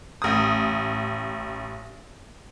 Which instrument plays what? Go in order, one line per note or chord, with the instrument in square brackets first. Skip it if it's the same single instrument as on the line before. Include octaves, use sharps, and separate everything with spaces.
[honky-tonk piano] A1 D#6